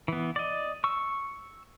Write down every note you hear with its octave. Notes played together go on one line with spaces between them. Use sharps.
E3 B3
D5 D#5
C#6 E6